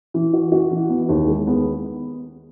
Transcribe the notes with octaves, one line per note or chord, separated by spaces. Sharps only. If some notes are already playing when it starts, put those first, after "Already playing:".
E3
F#4
F#4
E3
B3
D#2
G#3
B3